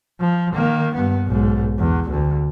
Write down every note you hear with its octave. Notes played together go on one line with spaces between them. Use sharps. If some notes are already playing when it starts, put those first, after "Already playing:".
F3
D#3 A#3
G2 B3
B1 G#2
E2
D2